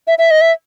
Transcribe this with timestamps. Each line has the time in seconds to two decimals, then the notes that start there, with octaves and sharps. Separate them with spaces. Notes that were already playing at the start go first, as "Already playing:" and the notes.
0.07 E5
0.18 E5
0.31 D#5
0.41 E5